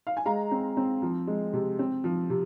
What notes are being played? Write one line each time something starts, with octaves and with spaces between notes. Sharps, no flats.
F5
G#5
G#3 F5 A#5
C4
C4
F3
G#3
C3
C4
F3
C3